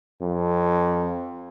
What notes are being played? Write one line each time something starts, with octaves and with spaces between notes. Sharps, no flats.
F2